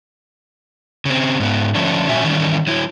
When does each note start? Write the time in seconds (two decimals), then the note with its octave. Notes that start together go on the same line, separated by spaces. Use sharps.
1.05 C#3 C4
1.40 G#2 B3
1.75 D3 F3 A3 C#4 D4
2.09 A#2 C#4 F#4 E5 G#5
2.24 D#3 E3 G3 C#4
2.67 F#3 E4